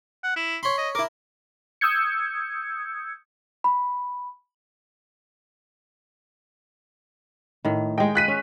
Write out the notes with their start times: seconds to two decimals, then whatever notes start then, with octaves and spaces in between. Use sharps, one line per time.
0.24 F#5
0.36 E4
0.63 C#5 B5 C6
0.78 D#5
0.95 E4 A#4 D6
1.81 D#6 E6 G6 G#6 C#7
3.64 B5
7.65 A2 D#3
7.98 G#3 D#5 G5
8.15 F#6 B6 D#7
8.28 C#4